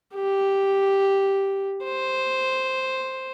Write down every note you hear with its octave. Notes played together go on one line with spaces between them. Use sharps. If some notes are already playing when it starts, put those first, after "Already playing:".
G4
C5